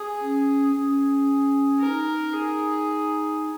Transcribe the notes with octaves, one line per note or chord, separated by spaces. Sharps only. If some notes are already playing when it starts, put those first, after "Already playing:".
Already playing: G#4
C#4
C#4 G#4
D#4 A#4
G#4